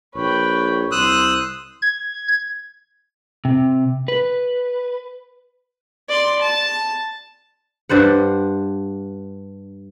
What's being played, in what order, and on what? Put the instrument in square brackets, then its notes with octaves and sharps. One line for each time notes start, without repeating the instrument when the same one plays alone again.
[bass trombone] A#1 [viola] B4 G5 [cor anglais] C#5
[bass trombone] C2 [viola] C5 [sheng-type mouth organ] D#6 E6 F#6
[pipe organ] G#6
[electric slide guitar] C3
B4
[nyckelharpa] D5 C6
A5
[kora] G2 D4 C5 F#5